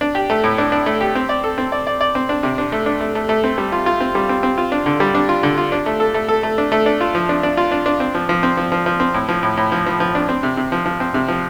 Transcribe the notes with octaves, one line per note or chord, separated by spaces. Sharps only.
D4
G4
A3
A2
D4
D4
A3
G4
C4
D5
A4
C4
D5
D5
D5
C4
D4
C3
D4
A3
D4
A3
A3
A3
C4
G3
F4
F4
C4
G3
C4
C4
F4
D4
D3
G3
D4
F4
D3
F4
D4
A3
A4
A3
A4
A3
D4
A3
D4
F4
F3
D4
D4
F4
D4
D4
C4
F3
F3
C4
F3
F3
F3
C4
A2
F3
A2
A2
F3
F3
F3
D4
C4
C3
C3
F3
F3
C4
C3
F3